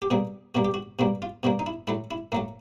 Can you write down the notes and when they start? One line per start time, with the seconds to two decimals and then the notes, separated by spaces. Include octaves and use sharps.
0.02 G4
0.10 B2 G3 A#3 G#4
0.55 B2 G3 A#3 F#4
0.65 G4
0.74 F#4
0.99 B2 G3 A#3 F#4
1.22 F4
1.43 B2 G3 A#3 F#4
1.59 D#4
1.66 E4
1.87 A2 F#3 A3 E4
2.11 E4
2.32 A2 F#3 A3 A#3